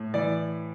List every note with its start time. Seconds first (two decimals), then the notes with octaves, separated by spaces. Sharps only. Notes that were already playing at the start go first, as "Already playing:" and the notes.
Already playing: A2
0.14 E3 D5